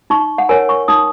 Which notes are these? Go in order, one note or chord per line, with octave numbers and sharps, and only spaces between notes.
D#4 C#6
F#5
A#4 C#5 G#5
C#6
D#4 D#6